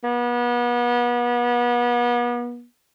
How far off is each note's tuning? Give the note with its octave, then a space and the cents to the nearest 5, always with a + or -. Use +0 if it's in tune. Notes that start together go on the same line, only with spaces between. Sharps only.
B3 -35